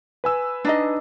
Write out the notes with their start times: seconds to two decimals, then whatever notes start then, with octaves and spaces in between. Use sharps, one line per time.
0.24 B4 G#5 E6
0.65 D4 D#4 D#5